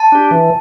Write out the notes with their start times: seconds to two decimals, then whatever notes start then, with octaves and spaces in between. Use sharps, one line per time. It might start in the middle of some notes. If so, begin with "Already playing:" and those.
Already playing: A5
0.12 D4 G4
0.31 E3